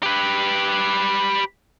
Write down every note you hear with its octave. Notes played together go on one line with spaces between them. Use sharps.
G4 B4